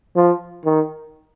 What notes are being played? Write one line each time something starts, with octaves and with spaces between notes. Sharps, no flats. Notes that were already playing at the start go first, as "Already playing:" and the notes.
F3
D#3